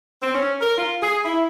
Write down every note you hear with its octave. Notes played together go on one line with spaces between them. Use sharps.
C4
C#4
A#4
F4
G#4
E4